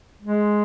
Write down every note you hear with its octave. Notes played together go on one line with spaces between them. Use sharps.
G#3